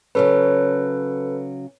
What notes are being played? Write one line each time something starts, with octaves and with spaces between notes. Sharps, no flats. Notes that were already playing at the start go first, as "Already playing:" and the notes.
C#3 F#3 C#4 A4 B4